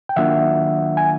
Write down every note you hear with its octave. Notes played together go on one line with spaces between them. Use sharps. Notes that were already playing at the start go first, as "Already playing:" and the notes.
G5
D#3 F#3 A#3 D4 F4 E5 F#5
G#5